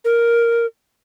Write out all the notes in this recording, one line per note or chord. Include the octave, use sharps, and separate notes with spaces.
A#4